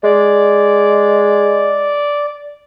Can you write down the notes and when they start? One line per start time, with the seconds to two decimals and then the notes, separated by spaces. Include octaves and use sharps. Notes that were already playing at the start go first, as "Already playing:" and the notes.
0.04 G#3 D5